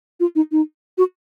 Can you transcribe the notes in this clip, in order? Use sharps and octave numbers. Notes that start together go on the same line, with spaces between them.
F4
D#4
D#4
F#4